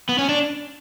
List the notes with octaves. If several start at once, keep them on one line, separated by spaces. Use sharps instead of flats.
B3
C#4
D4